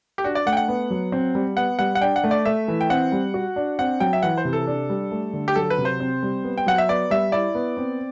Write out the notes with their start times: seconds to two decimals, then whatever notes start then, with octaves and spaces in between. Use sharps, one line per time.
0.18 G4
0.24 D4 F#4
0.35 D5
0.46 A3 F#5
0.53 G5
0.57 F#5
0.68 B3
0.90 F#3
1.12 C4
1.35 G3
1.57 B3 F#5
1.79 G3 F#5
1.95 F#5
2.01 D4 G5
2.16 F#5
2.24 A3
2.31 D5
2.45 A3 E5
2.68 E3
2.81 G5
2.90 C4 F#5
3.12 G3
3.34 F#4
3.56 D4
3.79 C4 F#5
4.00 F#3 G5
4.13 E5
4.23 E3 F#5
4.37 C5
4.45 C3
4.53 A4
4.67 D4
4.90 G3
5.11 A3
5.33 D3
5.48 G4
5.56 F#3 A4
5.70 B4
5.78 C3
5.85 C5
6.00 C4
6.23 G3
6.44 B3
6.58 G5
6.66 F#3 F#5
6.78 E5
6.89 B3 D5
7.10 G3 E5
7.32 E4 D5
7.55 B3
7.77 C4